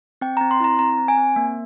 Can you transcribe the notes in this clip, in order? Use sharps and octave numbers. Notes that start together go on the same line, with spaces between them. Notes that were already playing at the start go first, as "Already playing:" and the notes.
C4 G5
A#5
C4
C6
E4 A#5
C4 A#5
C4
G#5
C4
A#3